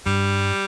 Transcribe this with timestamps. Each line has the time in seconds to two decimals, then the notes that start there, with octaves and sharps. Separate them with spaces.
0.06 G2 G3